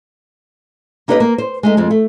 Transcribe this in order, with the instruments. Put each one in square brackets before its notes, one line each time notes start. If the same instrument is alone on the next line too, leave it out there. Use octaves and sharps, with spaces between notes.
[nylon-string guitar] A#3 D#4 G4 B4 D5 D#5
A#3
C5
G#3 A3 D#4
F2 F3 G#3
A3